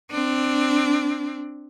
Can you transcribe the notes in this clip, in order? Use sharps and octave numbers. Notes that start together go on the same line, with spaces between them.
C4 D4